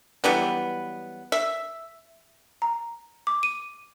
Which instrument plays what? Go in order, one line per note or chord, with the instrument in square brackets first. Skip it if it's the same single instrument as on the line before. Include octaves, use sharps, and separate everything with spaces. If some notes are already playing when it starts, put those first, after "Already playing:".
[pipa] E3 F#3 G3 B3
E5
[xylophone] A#5
D6
D#7